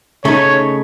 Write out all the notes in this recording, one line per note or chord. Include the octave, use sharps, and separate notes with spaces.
C#3 A3 D#4 C#5